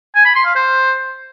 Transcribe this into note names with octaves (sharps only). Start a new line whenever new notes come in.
G#5
B5
C6
F5
C5